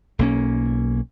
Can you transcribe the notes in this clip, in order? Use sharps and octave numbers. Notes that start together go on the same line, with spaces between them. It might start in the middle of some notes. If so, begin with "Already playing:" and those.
B1 A#3 C#4